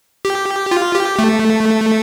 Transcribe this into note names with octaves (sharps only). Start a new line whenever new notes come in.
G4
F4
G4
A3